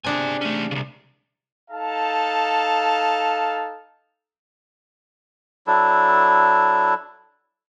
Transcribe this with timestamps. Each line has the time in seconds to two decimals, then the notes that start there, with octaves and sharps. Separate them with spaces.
0.04 C3 D4 G#4 D5 G#5
0.41 A3 C#4
0.71 C2 C#3
1.71 D#4 A4 F5 A5
5.67 F#3 D4 E4 A4